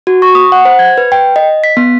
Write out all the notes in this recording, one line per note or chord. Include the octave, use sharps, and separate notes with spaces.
F#4
C#6
D#6
F#5
C5
G#6
B4
G5
D#5
B6
B3